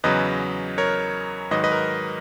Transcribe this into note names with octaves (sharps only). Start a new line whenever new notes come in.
E2 C#3 F#3 B4 D#5
A#4 C#5
G#2 D#3 F#3 B4 D#5
B4 D#5
A#4